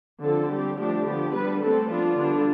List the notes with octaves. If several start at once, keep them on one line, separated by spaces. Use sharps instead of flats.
D3 F3 C4 A4
G3 C4 G4
F3 A3 D4 G4
D3 F3 B3 G4
G3 B3 D4 B4
D3 A3 C4 A4
F3 B3 D4 F4
D3 G3 B3 D4